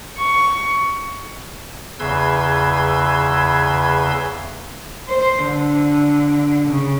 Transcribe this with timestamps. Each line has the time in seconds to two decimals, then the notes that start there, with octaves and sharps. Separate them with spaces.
0.18 C#6
2.00 E2 C#3 B4 C6 E6 G#6
5.09 C5
5.45 D3
6.69 C#3